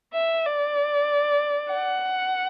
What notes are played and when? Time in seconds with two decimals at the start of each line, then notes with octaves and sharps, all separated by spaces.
0.14 E5
0.46 D5
1.72 F#5